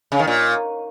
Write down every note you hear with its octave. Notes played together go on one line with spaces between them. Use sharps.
C#3
D#3
A#2